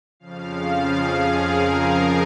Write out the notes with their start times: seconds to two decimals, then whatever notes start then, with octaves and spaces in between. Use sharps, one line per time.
0.20 F2 C#3 F3 F5
0.82 G#4
1.42 A#4